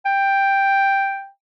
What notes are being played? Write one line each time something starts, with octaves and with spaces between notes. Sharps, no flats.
G5